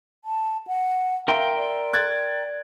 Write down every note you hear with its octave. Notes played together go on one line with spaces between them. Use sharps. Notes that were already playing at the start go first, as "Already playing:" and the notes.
A5
F#5
A#4 E5 F5 G5 C6
D5
F#6 G#6 A6